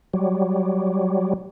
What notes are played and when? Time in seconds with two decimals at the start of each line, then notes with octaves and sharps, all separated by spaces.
0.14 F#3 G3